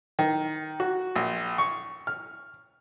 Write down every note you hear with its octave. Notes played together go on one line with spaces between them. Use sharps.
D#3
F#4
A#1
C#6
F6